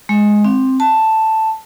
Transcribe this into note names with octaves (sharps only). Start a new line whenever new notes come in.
G#3
C4
A5